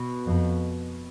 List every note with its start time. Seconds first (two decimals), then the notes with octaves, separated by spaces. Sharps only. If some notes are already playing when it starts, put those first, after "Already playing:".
Already playing: B2
0.27 F2